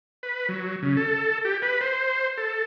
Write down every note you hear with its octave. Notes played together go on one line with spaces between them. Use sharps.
B4
F#3
C#3
A4
G4
B4
C5
A4